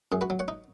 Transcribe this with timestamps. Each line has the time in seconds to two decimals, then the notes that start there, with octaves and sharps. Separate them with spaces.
0.12 F#2 G#4
0.21 F#4 B4
0.30 F#3
0.39 C#5 F#5
0.48 D#4